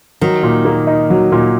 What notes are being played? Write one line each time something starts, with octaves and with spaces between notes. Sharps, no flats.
D#3 F#3
A#2
A#3
D#4
F#3
A#2